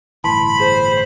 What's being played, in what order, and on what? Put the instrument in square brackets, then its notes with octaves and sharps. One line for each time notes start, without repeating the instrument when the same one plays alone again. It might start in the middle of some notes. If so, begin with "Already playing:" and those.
[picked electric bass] G1 A2 E3 [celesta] A5 C6 [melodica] B5
[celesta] G#4 [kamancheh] C5